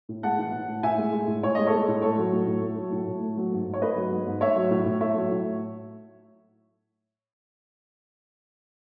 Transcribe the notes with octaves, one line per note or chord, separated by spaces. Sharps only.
A2
G#3 F#5 A5
E3
A2
A2
A2 E5 G#5
G#3
G#3
A2
A2 C#5
G#3 D#5
A4 C#5
G#3
A2
A3 A4 C#5
F#3
A2
A2
A3
F#3
A2
A2
A3
F#3
G#2
G#2
C#5
A3 B4 D#5
F#3
G#2
G#2
A3 C#5 E5
F#3
A2
A2
A3 C#5 E5
F#3
A2